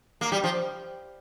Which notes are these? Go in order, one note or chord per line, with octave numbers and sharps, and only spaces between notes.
A#3
G3
F3